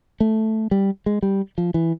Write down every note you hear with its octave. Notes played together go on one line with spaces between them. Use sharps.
A3
G3
G#3
G3
F3
E3